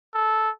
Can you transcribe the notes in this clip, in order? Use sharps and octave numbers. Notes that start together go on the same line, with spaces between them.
A4